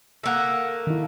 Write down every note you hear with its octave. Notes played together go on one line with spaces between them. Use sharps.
A3 A#3 E5 F#5
D#3 E4